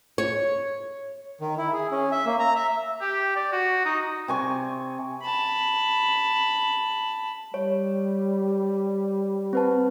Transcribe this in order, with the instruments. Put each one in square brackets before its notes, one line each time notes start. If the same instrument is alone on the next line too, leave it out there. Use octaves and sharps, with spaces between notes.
[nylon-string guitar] C#5
[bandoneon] D#3
E4
G#4
C#4
E5
A#3
A#5
E5
[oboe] G4
D5
F#4
D#4
[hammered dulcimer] C3 G#5 C#6
[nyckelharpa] A5 B5
[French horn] G3 [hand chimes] C#5
[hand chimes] C4 B4 A5